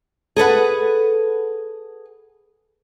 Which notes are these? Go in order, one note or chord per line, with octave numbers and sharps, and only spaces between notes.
G#4 A4 B4 F#5